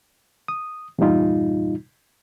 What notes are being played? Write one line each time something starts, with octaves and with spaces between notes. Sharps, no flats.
D#6
E2 G2 A#2 G3 D#4 F4